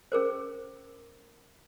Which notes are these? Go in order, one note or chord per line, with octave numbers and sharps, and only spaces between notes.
C#4 G#4 A#4 C5